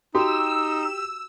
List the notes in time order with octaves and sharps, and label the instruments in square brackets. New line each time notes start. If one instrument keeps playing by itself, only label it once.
[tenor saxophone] D#4 [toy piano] F#4 [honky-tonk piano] G4 [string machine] E6